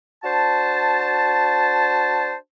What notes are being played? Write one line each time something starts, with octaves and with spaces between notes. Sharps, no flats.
D4 F#4 C5 A5